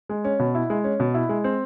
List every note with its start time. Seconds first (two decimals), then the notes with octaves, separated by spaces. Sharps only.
0.09 G#3
0.25 C#4
0.39 B2
0.55 E4
0.70 G#3
0.84 C#4
1.00 B2
1.14 E4
1.29 G#3
1.44 C4